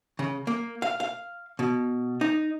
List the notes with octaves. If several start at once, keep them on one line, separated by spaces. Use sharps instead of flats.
C#3
A#3
F5
F5
B2
D#4